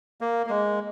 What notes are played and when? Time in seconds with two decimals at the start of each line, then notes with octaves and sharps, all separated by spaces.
0.21 A#3
0.46 A#3
0.50 G#3